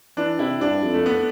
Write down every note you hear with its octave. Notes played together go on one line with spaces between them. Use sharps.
E3 D4
C3 E4
G2 D4
F2
A3
B3